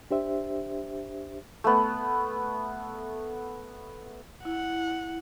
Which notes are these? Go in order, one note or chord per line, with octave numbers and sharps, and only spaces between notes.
D4 G4 C5 E5
A3 B3
E4 F#5